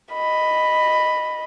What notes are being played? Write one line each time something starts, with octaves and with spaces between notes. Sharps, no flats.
D#5 B5